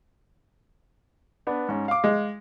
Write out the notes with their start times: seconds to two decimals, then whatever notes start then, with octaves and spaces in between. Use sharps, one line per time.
1.47 B3 D4 B4
1.69 G#2 C#4
1.88 F5 D6
2.04 G#3